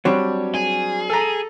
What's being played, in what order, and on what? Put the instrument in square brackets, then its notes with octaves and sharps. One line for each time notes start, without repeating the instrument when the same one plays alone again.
[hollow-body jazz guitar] F#3 C4 D4 [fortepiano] G3 C#5
[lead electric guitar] G#4
[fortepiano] A4 A#5